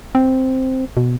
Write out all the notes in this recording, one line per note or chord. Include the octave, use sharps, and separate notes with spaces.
C4
B2